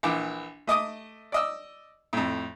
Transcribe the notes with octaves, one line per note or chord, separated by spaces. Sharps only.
A#1 E3 D6
A3 D#5 D6 D#6
D5 D#5 E6
F2 A2